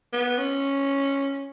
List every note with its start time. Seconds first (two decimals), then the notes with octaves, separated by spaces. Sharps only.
0.13 B3
0.38 C#4